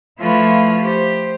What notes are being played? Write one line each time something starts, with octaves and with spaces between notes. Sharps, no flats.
F3 A3 E4 F4 B4 C#5
G4 C5